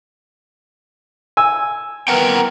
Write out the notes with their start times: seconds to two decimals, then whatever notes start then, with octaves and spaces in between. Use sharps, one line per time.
1.37 G#5 E6
2.08 E3 B3 A#4 F#5 G5 A#5